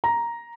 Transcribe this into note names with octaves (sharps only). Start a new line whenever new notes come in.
A#5